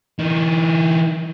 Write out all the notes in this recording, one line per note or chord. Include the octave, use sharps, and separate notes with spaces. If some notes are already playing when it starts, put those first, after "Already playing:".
E3 D#4